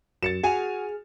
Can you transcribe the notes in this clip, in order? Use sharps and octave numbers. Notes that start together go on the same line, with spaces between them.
F#2 A6 C#7 E7
F#4 G#4 G#5 F6